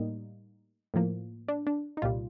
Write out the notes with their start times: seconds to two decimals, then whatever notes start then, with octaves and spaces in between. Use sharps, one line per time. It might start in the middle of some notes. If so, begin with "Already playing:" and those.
Already playing: A2 G3 A#3 D#4
0.94 A2 F3 A#3
1.48 D4
1.67 D4
1.97 D#4
2.02 C2 A#2 G3 F4